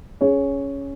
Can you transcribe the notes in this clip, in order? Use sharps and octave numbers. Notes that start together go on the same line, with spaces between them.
C#4 G#4 C#5